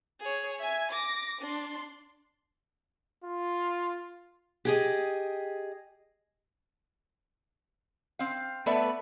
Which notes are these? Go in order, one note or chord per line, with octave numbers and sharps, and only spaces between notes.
G#4 C#5
E5 G#5
D6 A#6
D4 C6
F4
G4 G#4 D#5
C4 F5
A3 B3 A4 B4 D5 E5